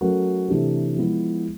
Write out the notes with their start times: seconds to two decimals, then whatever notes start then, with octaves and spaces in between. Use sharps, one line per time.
0.01 F#3 A3 C#4 F#4 A#4
0.48 C3 E3 A3 D4 G4
0.96 F3 G#3 B3 E4